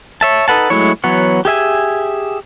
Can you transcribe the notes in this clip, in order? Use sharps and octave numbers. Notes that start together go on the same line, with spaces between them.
C#5 E5 A5
D#4 A4 B4 F#5 A5
F#3 G#3 A3 E4 C#5
E3 F#3 B3 C#5
G4 G#4 E5 G#5